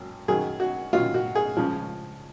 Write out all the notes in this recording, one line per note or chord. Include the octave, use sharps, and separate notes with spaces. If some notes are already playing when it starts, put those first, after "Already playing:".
Already playing: G#1 F#2
F#2 D#3 F#3 G#4
F#4
F#2 D#3 F#3 F4
F#4
G#4
C#2 C#3 F3